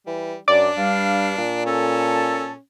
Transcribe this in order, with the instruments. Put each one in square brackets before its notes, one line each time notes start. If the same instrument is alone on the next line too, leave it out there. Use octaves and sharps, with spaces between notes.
[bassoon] E3 [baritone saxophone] G3
[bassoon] F#2 [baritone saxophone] D4 [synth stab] D5
[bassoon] G2 [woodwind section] G3 F5
[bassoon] A#2
[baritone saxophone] C#4 [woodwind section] A4